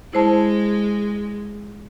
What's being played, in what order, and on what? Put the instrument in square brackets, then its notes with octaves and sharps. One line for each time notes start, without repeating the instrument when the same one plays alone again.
[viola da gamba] G#3 [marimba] E4 C5 A5